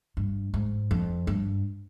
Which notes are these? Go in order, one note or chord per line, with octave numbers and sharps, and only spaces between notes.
G2
G#2
F2
G2